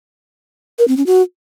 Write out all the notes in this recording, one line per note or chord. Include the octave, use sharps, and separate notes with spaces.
A#4
C4
C#4
F#4